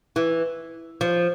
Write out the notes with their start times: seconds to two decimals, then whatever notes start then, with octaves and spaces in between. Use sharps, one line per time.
0.16 E3
1.01 F3